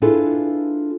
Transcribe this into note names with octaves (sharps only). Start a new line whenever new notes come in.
D4 E4 F4 G#4 A4 B4